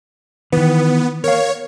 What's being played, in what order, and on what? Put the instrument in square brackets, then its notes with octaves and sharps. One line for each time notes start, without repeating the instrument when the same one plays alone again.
[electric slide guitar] D#3 E3 [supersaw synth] B3
[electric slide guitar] A#4 F5 [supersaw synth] C#5